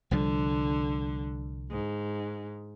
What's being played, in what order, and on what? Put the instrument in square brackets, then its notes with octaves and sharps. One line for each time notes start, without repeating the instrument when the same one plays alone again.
[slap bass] C2 F3 G3 [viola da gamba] D3
[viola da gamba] G#2